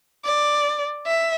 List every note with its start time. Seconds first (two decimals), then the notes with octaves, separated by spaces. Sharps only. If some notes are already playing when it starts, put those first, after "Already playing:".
0.25 D5
1.06 E5